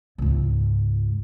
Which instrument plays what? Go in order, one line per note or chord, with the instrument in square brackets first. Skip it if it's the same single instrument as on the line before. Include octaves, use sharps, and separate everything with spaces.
[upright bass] C#2 G#2